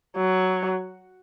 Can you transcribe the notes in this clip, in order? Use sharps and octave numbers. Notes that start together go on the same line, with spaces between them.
F#3